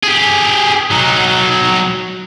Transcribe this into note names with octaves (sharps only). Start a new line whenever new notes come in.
G4 G#4
F#3 D#4